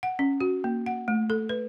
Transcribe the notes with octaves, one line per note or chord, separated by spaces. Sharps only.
F#5
C#4
F#4
A#3
F#5
A3
A4
B4